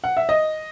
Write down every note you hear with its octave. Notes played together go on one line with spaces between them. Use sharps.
F#5
E5
D#5